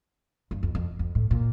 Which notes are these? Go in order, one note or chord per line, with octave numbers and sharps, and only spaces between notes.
G2
F2
F2
F2
A2
A#2